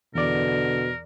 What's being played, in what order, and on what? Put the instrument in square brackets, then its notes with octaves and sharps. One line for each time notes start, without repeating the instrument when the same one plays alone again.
[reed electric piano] E2 D5 [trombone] B2 [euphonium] D3 [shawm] A#4